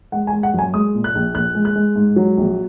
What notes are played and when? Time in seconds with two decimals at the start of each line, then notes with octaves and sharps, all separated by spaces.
0.12 G#3 F#5
0.27 G#5
0.33 G#3
0.43 F#5
0.54 F#2 G#5
0.73 G#3 D#6
0.95 A#2
1.04 F#6
1.15 A#1
1.35 A#1 F#6
1.55 G#3
1.65 F#6
1.76 G#3
1.96 G#2
2.16 F#3
2.38 A#1